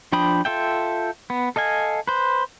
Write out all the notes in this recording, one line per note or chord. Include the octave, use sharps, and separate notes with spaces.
F3 D4 G5 B5 D#6
F4 A4 E5 G5
B3
A4 D#5 F5 G#5
B4 C5